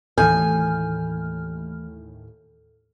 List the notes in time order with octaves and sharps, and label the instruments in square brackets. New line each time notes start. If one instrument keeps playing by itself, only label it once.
[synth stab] D#2 A2 [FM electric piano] E3 F6 [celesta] A4 G6 [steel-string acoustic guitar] G#5